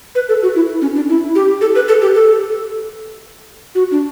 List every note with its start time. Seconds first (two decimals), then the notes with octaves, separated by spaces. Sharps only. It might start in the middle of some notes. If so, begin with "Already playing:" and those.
0.15 B4
0.29 A4
0.43 F#4
0.56 E4
0.82 C#4
0.95 D4
1.09 E4
1.35 G4
1.61 A4
1.75 B4
1.88 A4
2.02 G4
2.15 A4
3.75 F#4
3.91 D4